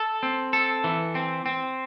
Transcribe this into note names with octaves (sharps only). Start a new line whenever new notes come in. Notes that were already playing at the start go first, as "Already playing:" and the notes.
Already playing: A4
C4
A4
E3
C4
C4